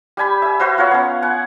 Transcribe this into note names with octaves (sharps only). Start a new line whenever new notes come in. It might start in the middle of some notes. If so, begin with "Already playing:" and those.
G3 G5 G#5 B5
E5 G#5
F#4 B4 C5 E5
F4 A#4 C#5 F#5
B3 C#4
F#5 G#5